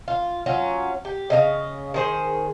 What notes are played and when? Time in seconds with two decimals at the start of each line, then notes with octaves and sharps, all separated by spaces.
0.08 F4
0.46 F#3 C#4 F4
1.05 G4
1.30 C#3 D#5 F5
1.94 D#3 G#4 C5